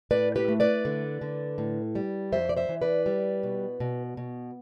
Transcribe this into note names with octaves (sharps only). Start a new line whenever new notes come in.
A2 B4 D5
G4 B4
A3
B4 D5
D3
D3
A2
G3
F2 C5 E5
D5
C5 E5
E3
B4 D5
G3
B2
B2
B2